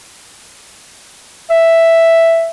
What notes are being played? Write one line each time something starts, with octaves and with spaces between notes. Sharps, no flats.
E5